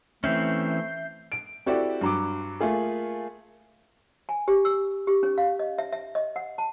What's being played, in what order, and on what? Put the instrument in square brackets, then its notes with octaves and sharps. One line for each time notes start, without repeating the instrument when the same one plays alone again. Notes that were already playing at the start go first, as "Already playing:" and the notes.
[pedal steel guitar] E3 C4 C#4 [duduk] A3 [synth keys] E5 G6 C7
[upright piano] D7
C4 E4 F#4 G4 A4 D5
G2 F#3 D6
A3 A#3 F4 G#4
[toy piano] G#5
G4
E6
G4
C#4
F5
D#5
E5
E5
D#5
F#5
A5